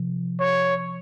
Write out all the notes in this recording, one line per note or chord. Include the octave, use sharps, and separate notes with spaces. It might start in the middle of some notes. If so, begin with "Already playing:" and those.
Already playing: C3 F3
C#5